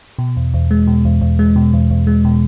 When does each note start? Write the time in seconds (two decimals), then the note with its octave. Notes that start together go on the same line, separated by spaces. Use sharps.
0.19 B2
0.37 E2
0.54 E2
0.71 G#3
0.87 B2
1.05 E2
1.21 E2
1.39 G#3
1.56 B2
1.73 E2
1.91 E2
2.07 G#3
2.25 B2